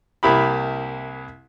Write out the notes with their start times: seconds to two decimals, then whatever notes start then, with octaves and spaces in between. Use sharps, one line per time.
0.23 C2 A#3 E4 G4 B5